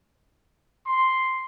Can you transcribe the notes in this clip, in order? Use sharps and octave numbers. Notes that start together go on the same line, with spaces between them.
C6